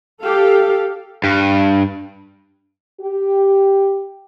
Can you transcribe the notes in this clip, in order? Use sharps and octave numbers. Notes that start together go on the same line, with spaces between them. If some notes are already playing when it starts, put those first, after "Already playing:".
G4 A4 F5
G2
G4